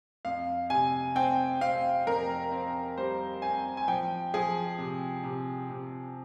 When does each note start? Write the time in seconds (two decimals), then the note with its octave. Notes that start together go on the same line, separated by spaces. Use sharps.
0.25 F2 F5
0.70 C3 G#5
1.15 C4 G5
1.61 C4 F5
2.07 F2 A#4
2.52 C4
2.97 G3 C5
3.42 C4 G#5
3.77 G#5
3.88 F3 G5
4.34 F3 G#4
4.78 C3
5.24 C3
5.70 C3